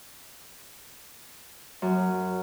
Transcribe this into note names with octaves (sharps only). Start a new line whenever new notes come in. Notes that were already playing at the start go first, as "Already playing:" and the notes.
F#2